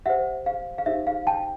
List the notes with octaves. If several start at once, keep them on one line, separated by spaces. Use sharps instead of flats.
G4 C5 E5 F#5
F5
F5
D#4 G4 C5 E5
F5
G5 A5